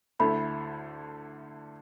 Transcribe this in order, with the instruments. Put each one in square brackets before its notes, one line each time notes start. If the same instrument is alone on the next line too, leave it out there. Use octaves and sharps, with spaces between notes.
[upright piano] D2 D3 A3 E4 [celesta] B5